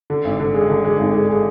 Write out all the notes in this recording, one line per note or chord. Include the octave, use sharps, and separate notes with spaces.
D3
G#1
D3
G#3
D3
G#3
G#1
G#3
G#3